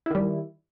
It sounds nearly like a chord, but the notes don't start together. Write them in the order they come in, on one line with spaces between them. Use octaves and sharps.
E4 D#3 G3